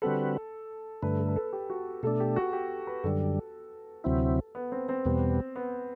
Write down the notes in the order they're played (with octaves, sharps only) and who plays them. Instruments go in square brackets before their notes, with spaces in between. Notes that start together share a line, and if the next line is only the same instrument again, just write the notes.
[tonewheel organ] D3 G3 C4 F#4 B4 [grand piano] A4
[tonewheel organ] G2 D3 A3 [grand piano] B4
[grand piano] A4
B4
A4
G4
F#4
[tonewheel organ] B2 A3 D4 [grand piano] A4
[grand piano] G4
F#4
G4
B4
[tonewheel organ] F#2 D3 G3 [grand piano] A4
[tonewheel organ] D2 C3 F#3 C4 E4
[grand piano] B3
C4
C4
[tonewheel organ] E2 B2 G3 B3
[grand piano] B3